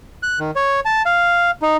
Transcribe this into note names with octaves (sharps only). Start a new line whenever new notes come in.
F#6
D#3
C#5
A5
F5
D#4